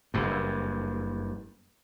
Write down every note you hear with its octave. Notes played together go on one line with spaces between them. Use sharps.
F#1 G2